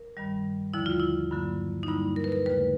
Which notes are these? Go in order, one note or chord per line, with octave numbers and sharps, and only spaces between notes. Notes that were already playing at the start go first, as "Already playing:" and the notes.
Already playing: A#4
G2 D#3 G3
D#2 D3 F3 E4
F4
E4
G2 D3 F#3 A#3
D#4
G2 D3 G3 A#3 E4
A#4
B4
A#4
D#2 C#3 E3 A3 B4